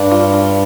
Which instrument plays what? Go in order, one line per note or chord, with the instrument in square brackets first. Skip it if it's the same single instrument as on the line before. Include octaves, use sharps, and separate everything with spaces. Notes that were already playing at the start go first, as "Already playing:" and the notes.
Already playing: [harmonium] G2 [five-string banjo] D4
[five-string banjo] F4
F4